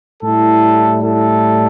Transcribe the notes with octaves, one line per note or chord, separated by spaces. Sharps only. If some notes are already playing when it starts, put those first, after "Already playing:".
A2 G3 E4 A4
E4 A4